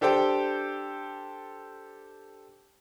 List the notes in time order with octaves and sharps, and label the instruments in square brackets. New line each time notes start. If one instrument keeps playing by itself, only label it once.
[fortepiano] D4 G4 A4 C5 G5